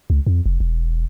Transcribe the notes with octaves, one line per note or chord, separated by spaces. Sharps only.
C#2
F2
F1
E1